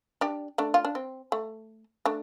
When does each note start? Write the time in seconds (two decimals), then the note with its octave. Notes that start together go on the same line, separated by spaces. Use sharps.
0.21 D4 G4
0.58 A3 D4
0.74 F4
0.85 D4
0.95 C4
1.32 A3
2.05 A3 D4